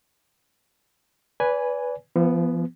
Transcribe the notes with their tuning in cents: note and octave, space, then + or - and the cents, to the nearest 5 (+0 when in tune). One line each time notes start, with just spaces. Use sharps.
B4 +0 D5 -35 G#5 +0
F3 -40 B3 +0